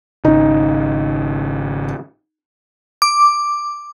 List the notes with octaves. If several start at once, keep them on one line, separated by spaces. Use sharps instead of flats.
G#1 C#3 D#4
D6